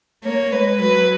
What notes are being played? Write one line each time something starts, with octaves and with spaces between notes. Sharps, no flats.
A#3 C#5
G#3 B4
F#3 B4